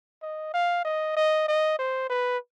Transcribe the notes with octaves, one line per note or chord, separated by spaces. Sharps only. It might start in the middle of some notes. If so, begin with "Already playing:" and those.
D#5
F5
D#5
D#5
D#5
C5
B4